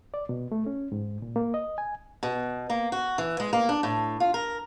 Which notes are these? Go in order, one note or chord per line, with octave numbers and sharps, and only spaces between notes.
D5
B2
A3
C#4
G#2
A#2
A#3
D#5
G#5
B2
A#3
F#4
E3
G#3
A#3
D4
A2
F4
A#4